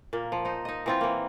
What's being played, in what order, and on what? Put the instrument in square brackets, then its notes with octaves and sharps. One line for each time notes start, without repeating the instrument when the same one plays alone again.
[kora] A#2 A#3
F3
D#4 C5
D#4 D#5
E3 C4 F4
E3 A#3